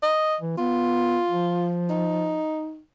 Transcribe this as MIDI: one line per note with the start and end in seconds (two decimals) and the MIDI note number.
0.03 0.37 75
0.41 0.55 52
0.58 1.20 59
0.58 1.75 65
1.29 2.41 53
1.90 2.80 63